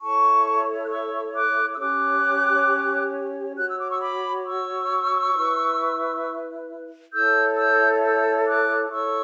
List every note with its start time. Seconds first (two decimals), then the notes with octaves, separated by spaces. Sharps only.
0.01 E4 A4 C#5 A5 C#6
0.83 F#6
0.89 C#6 E6
1.34 D6 F#6
1.74 E6
1.78 C#4 G4 C#5 D6 F#6
3.57 F#4 C#5 F#6
3.68 E6
3.79 D6
3.90 C#6 E6
4.01 B5 D6
4.45 C#6 E6
5.34 E4 B4
7.12 E4 A4 C#5 E6 G6
7.57 E6 G6
8.02 E6 G6
8.47 D6 F#6
8.91 E4 A4 C#5 C#6 E6